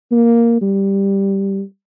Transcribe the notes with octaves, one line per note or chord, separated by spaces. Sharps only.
A#3
G3